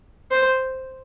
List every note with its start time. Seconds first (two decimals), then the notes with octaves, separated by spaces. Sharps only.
0.31 C5